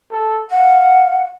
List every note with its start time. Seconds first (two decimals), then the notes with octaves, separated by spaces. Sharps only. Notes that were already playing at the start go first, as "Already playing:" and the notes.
0.11 A4
0.51 F5 F#5